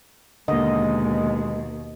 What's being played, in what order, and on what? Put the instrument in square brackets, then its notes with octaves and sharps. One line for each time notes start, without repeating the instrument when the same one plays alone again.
[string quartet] D#2 B2 [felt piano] D3 A#3 [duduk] G#3 [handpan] D#5